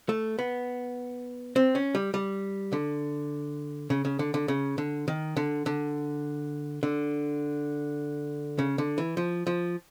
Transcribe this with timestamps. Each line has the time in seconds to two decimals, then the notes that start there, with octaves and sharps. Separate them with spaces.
0.09 A3
0.39 B3
1.56 C4
1.75 C#4
1.95 G3
2.14 G3
2.73 D3
3.90 C#3
4.05 C#3
4.19 D3
4.34 D3
4.48 C#3
4.78 D3
5.08 D#3
5.37 D3
5.66 D3
6.83 D3
8.59 C#3
8.78 D3
8.98 E3
9.17 F3
9.47 F3